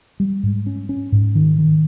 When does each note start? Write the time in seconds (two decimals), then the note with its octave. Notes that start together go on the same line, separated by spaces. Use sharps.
0.20 G3
0.43 G#2
0.66 C#4
0.89 C#4
1.12 G#2
1.35 D#3
1.58 D#3